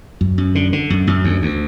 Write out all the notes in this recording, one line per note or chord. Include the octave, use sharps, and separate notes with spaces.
F#2
F#2
D3
D3
F#2
F#2
D2
D2